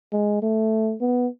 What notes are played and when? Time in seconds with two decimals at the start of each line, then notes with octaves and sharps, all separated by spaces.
0.13 G#3
0.42 A3
1.01 B3